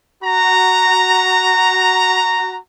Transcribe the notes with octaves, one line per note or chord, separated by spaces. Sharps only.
F#4 A#5